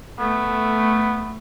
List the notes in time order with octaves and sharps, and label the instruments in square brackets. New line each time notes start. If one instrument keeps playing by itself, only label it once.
[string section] A3 [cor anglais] B3